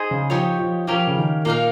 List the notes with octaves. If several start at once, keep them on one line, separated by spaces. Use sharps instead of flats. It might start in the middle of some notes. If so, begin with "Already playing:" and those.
Already playing: D#4 G#4 C5 D#5
C#3
F3 D#4 G4 C#5
F3
F3 A#3 C#4 G4 A#4
C#3
D#3
A#2 A#3 D#4 A#4 F5